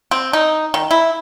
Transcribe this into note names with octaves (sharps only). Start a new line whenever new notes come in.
C4
D#4
D#3
E4